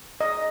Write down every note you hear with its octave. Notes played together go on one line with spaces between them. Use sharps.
D#5